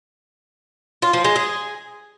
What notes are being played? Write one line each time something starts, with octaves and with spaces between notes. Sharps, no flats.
F4
F3
G#3
G#4